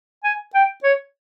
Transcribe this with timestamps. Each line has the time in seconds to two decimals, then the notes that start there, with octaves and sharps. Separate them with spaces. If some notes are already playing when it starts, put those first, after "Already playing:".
0.24 G#5
0.55 G5
0.84 C#5